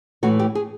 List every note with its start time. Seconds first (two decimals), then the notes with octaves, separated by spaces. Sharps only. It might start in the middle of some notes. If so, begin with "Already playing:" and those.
0.23 A2 E3 A3 F#4
0.39 G4
0.55 G#4